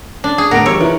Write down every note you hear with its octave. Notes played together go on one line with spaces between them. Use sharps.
D4
G#4
D2 A2 B3 A#4 F#5 D7
E3 G3 C#5 E6
E3 F4 B4 A#5